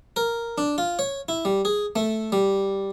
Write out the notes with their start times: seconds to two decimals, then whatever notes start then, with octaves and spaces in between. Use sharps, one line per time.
0.16 A#4
0.58 D4
0.78 F4
0.99 C#5
1.29 E4
1.45 G3
1.65 G#4
1.96 A3
2.32 G3